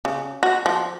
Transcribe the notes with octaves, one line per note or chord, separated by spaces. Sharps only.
C#3
F#4
F3